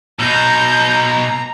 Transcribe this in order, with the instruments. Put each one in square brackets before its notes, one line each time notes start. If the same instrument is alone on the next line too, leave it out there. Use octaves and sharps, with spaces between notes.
[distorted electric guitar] B2 D#4 [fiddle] A#5 [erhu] G6